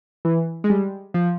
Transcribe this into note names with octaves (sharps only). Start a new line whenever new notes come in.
E3
G#3
G3
F3